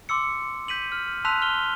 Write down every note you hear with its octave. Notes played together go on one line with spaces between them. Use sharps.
C6 D6 E6 C#7
G6 B6 D#7 F#7
F6
A5 C6 E6 F#6 B6 F7
C6 F6 G7